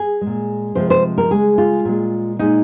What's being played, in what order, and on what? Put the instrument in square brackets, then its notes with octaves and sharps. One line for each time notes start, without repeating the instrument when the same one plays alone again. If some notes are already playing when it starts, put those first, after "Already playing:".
Already playing: [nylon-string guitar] G#4
G#3
A#2
C3 F3 G#3 C5
C5
A#4
C#3 G#3 G#4
F4
A#2 G#3
A#2 G#3 D#4